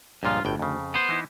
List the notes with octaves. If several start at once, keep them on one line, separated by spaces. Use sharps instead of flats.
C#2 G2 A#2 F3 F4
G1 D2 A2 G5
F2 C#3
B3 C5
E3 D#4 E4